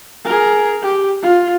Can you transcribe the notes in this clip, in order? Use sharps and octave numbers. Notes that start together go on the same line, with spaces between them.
G#4 A#4
G4
F4